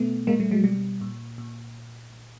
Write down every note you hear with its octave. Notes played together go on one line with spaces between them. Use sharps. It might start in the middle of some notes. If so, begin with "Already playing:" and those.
Already playing: B2 A3 B3
A#2 G#3 A#3
G3 A3
F#3 G#3
B2 G3
A#2
A#2